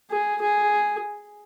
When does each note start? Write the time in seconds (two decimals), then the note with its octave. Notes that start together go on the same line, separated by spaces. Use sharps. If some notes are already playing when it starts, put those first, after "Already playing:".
0.10 G#4
0.42 G#4